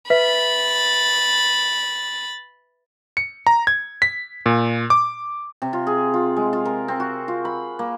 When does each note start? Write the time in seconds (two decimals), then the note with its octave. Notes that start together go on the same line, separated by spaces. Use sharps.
0.10 B4 E5 B5 A6 B6
3.17 C#7
3.47 A#5
3.67 G#6
4.02 B6
4.46 A#2
4.90 D6
5.62 C3
5.73 F4
5.87 G#4
6.14 F4
6.36 G#3
6.53 F4
6.65 A#4
6.88 C4
7.00 F#4
7.28 F4
7.45 B5
7.79 A#3